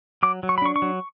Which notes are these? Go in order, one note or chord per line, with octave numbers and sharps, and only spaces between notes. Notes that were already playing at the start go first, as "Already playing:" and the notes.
F#3 D6
F#3
C#6
B5
D4 C#6
C#6
F#3